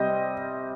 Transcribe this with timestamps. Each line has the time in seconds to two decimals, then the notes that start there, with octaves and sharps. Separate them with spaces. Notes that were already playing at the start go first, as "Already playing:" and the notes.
Already playing: C3 G3 C4 D#5